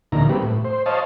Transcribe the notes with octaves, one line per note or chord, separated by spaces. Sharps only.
D2 A#2 D3 E3 D#4 A#5
G3 A#3 C4 G4 B4
A2
C5
C5 C#5 D#5 F5 A5